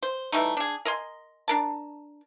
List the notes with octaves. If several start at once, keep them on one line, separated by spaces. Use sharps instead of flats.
C5
E3 G3 A3 D#4
D4 G#4
A#4 D#5 G#5 C6
D4 A#4 A5